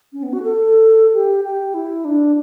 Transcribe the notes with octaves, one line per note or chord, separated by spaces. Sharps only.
C#4
B3
F#4
A4
G4
G4
E4
D4